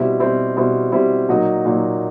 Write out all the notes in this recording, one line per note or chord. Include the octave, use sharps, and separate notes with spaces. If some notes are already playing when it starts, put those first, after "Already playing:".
Already playing: B2 G3 C4 E4
B2 G3 C4 E4
B2 G3 C4 E4
B2 G3 C4 E4
A#2 F#3 A#3 D#4
A#2 F#3 A#3 D#4